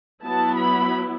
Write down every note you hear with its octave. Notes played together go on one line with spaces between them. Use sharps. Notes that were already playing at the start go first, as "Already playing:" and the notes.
F#3 B3 E4 A5
B5